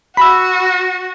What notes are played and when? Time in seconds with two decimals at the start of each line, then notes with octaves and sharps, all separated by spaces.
0.17 F#4 B5 E6